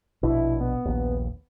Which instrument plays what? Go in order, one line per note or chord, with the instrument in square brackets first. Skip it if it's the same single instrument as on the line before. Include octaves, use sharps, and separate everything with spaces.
[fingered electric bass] A#1 B2 D4 [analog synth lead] E4
[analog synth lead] B3
[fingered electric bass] A#1 D#2